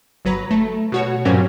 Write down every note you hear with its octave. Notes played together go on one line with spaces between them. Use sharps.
G1 F#3 B4 A#5
A3
B2 F#4 C#5
G2 A#2 F#3 C4 C#4